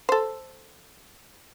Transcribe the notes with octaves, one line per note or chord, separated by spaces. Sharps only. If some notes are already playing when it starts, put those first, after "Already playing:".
A4 C5